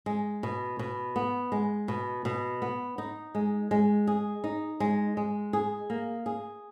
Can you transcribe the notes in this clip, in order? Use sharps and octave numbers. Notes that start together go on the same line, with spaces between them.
G#3
B2
B2
B3
G#3
B2
B2
B3
D#4
G#3
G#3
G#4
D#4
G#3
G#3
G#4
A#3
G#4